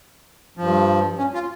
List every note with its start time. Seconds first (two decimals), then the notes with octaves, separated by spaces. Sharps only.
0.57 G2 F3
1.18 C#4
1.34 F4